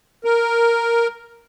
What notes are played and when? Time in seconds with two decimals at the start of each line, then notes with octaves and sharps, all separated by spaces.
0.24 A#4